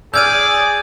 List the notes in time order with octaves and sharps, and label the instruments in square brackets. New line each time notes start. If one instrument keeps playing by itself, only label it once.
[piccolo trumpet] G#4 [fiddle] D5 [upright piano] E6 F6 [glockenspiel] G6 G#6 D#7